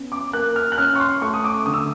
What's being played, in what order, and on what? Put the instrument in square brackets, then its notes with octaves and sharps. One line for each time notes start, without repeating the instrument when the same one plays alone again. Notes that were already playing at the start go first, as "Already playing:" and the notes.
Already playing: [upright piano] B3 C#4
D6
A#3 F#6
F6
F#6
C#4 F6
C#6
C6
A3 C#6
D#6
D6
D3 D#6
E6